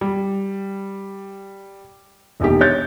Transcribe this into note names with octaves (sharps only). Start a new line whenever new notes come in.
G3
E1 A#1 D#3 G4
C#5 G6 A6